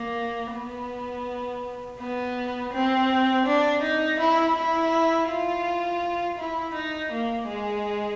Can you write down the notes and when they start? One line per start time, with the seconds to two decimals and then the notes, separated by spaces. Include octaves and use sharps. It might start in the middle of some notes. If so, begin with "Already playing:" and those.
Already playing: A#3
0.54 B3
2.00 B3
2.73 C4
3.46 D4
3.82 D#4
4.19 E4
4.56 E4
5.29 F4
6.38 E4
6.74 D#4
7.12 A#3
7.48 G#3